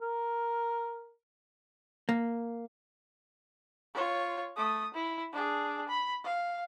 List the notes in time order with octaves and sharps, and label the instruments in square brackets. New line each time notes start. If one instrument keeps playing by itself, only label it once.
[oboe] A#4
[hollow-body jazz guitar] A#3
[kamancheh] F4 C#5
A3 D#6
E4
D4 G#4
B5
F5